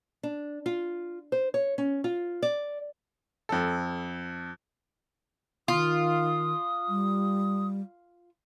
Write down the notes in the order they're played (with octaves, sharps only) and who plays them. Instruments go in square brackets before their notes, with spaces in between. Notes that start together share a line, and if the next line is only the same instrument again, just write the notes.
[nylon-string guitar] D4
F4
C5
C#5
C#4
F4
D5
[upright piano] F2 A4
[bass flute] D#3 [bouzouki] F4 [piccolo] D#6
[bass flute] G3